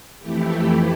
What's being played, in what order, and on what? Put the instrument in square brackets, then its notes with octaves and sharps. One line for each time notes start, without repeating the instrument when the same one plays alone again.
[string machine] F2 E3 A3 E4 G4